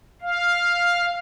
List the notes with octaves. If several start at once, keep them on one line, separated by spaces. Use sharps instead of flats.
F5